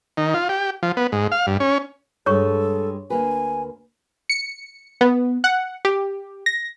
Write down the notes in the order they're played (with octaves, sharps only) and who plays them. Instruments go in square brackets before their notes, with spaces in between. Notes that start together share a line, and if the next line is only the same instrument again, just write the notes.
[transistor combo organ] D#3
F4
G4
F3
B3
G#2
F5
G2
C#4
[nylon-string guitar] G2 G3 G#3 [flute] A4 [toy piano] C#5 C#6
[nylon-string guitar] D2 A#3 B4 [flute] G#5
[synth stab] C#7
B3
F#5
G4
A#6